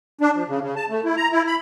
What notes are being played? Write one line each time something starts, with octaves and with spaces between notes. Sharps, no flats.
D4
F3
C#3
C#3
A5
A3
E4
A#5
E4
B5